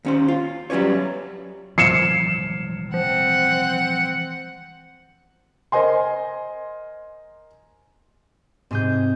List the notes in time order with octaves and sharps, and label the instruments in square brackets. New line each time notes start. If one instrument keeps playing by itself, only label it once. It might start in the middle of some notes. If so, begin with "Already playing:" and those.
[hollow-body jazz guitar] D#2 C#4 C5
F4
F#3 G3 C#4 B4 C#5
[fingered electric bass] E3 G3 G#3 [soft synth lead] F3 [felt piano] C7 C#7 E7
[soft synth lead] F3 [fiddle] C4 F#5
[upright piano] A#4 C5 D#5 G#5 C6
[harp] G#2 G#4 G6 [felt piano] C3